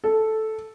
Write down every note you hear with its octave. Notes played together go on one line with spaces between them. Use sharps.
A4